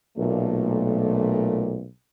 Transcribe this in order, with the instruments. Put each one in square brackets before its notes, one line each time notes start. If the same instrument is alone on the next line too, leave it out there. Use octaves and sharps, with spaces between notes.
[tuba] B1 [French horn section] A#2 A3